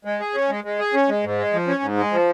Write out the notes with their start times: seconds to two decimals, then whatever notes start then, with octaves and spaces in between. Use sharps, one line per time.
0.05 G#3
0.20 G#4
0.35 C#4
0.49 G#3
0.64 G#3
0.79 G#4
0.94 C#4
1.09 G#3
1.24 G#2
1.38 G#3
1.53 F3
1.67 C#4
1.83 G#2
1.97 G#3
2.12 F3